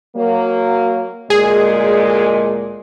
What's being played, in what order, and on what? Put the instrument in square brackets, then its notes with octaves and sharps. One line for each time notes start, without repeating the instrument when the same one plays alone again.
[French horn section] F#3 A#3
[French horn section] D2 A#2 G#3 [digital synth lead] G#4